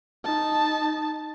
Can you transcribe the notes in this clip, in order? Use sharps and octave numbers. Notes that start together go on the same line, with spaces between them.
D#4 A5